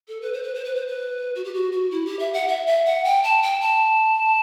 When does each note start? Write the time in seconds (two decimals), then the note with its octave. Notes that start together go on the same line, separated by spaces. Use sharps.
0.08 A4
0.22 B4
0.33 C5
0.43 B4
0.54 C5
0.65 B4
0.75 C5
0.87 B4
1.35 F#4
1.44 G4
1.54 F#4
1.72 F#4
1.91 E4
2.06 G4
2.19 E5
2.34 F#5
2.48 E5
2.67 E5
2.86 F#5
3.05 G5
3.24 A5
3.43 G5
3.61 A5